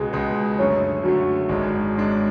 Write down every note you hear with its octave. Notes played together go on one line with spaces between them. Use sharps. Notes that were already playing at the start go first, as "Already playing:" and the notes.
Already playing: C#2 B2 G#3 G#4
C#2 B2 G#3
F#2 D3 A3 C#5
F#2 D3 A3 F#4
G#1 G#2 G#3 D4
G#1 G#2 G#3 D4